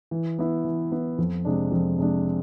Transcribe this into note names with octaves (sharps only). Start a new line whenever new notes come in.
E3
B3 E4
E3
B3 E4
F2
C3 G#3 D4
F2
C3 G#3 D4